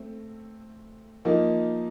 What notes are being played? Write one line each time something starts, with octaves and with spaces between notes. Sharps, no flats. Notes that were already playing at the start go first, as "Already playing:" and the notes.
Already playing: A3 C4
F3 A#3 D#4